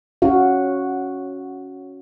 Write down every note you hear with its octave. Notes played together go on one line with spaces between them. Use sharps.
C#4 F#4 F5